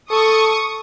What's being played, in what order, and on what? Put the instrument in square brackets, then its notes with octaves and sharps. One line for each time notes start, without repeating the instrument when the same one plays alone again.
[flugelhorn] A4 [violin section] C#6 D#6